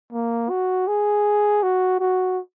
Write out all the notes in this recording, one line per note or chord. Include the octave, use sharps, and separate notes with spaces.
A#3
F#4
G#4
F#4
F#4